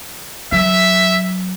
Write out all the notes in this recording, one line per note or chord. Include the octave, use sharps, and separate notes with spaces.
F#3 E5